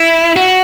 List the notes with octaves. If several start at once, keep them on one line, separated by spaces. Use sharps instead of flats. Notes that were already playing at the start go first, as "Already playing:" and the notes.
Already playing: E4
F#4